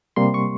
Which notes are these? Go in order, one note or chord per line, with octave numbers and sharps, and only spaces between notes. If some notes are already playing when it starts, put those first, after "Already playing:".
C3 G3 A#3 C6
C#6